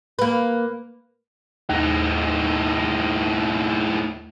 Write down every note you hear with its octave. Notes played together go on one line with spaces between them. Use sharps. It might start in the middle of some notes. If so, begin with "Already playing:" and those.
A#3 B4
D#2 A2 D#4